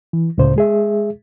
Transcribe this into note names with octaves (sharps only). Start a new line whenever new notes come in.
E3
C#2 A2 C#3 C5
G#3 G#4 E5